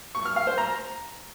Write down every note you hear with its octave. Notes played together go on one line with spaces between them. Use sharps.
C#6
F6
F5
C5
A#5